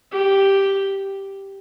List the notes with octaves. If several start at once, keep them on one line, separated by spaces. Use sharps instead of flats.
G4